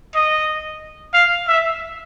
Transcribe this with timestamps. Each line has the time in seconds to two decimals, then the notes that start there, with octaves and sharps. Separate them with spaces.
0.15 D#5
1.14 F5
1.48 E5